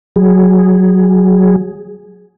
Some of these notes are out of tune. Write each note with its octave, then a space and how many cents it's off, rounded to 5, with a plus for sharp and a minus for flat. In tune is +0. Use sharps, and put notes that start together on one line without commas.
F#3 +0 G#4 +0